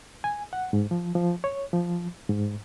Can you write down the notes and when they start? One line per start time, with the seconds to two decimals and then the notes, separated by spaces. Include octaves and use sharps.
0.24 G#5
0.53 F#5
0.73 G#2
0.91 F3
1.15 F3
1.44 C#5
1.73 F3
2.29 G#2